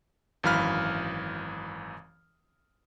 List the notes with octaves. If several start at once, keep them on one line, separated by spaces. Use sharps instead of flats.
G#1 F#2 E3 F5 B5 F6